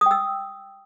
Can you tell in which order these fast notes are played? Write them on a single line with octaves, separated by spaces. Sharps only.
D#6 G5 E6